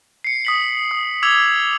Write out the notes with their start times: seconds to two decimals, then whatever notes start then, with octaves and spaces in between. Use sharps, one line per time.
0.24 C7 C#7
0.45 D#6 B6 F#7
0.91 D#6
1.23 D6 E6 G#6 F7 F#7